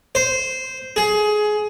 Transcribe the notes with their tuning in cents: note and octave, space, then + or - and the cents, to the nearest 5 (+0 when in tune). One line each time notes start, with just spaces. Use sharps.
C5 -10
G#4 +20